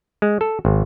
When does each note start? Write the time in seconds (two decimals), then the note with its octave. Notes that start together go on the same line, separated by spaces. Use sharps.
0.22 G#3
0.41 A4
0.65 G#1